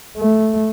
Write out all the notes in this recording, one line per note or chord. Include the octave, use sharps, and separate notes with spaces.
A3